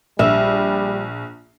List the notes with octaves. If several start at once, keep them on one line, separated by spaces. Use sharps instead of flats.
A#1 G3 E5